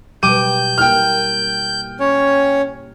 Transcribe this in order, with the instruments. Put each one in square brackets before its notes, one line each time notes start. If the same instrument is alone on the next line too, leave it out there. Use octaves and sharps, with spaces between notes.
[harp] B2 G3 [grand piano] D6 D#7 [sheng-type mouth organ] G6
[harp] A#3 E4 [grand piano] G5 F6
[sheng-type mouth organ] C#4 C#5